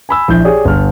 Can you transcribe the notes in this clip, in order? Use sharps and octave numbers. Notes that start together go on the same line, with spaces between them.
G#5 B5 E6
A#1 E4 G6
G4 G#4 C#5 D5
G1 F6